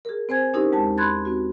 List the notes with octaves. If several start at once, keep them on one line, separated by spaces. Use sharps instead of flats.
G#4 A#4
C4 C5 G#5 G#6
C#4 D#4 E4 G4 A#4 C5
D#2 G#3 A5
B5 C6 F#6 G#6 A6
C4 F#4